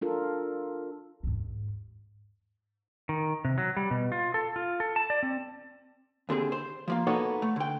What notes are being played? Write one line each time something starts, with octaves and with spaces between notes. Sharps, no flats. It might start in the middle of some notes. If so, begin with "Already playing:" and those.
D4 F4 A4 A#4
D#2 G#2
D#3
C3
F#3
G3
B2
F4
A4
F4
A4
A5
D5
C4
D#2 D3 C4 G#4
C5
F3 A#3 F4
A#3 B3 D#4 F#4 A4 C#5
A3
D3 G5